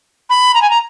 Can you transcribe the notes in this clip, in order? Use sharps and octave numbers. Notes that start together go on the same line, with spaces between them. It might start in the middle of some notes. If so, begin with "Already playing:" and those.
B5
A#5
G#5
A#5